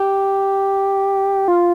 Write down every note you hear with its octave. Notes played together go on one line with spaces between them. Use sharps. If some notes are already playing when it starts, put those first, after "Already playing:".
Already playing: G4
F4